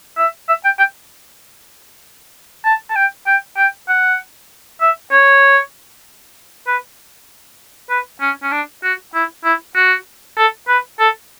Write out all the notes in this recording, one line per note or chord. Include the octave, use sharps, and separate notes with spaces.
E5
E5
G5
G5
A5
A5
G5
G5
G5
F#5
E5
C#5
B4
B4
C#4
C#4
D4
F#4
E4
E4
F#4
A4
B4
A4